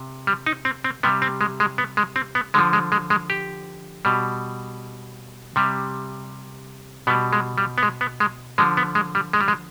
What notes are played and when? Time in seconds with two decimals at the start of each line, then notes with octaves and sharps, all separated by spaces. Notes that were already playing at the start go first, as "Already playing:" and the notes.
Already playing: C3
0.27 G3
0.46 D#4
0.65 C4
0.84 C4
1.03 C3 G3 B3
1.22 C4
1.41 G#3
1.60 G#3
1.78 B3
1.97 G#3
2.16 C4
2.35 B3
2.54 D3 F3 G#3
2.73 G#3
2.92 G#3
3.10 G#3
3.30 G4
4.05 B2 G3
5.56 C3 G3
7.07 B2 G3 B3
7.33 G#3
7.58 G3
7.78 B3
7.83 G#3
8.01 B3
8.20 G#3
8.58 D3 F3 G#3
8.77 B3
8.95 G#3
9.15 G3
9.33 G#3
9.41 G3
9.48 G#3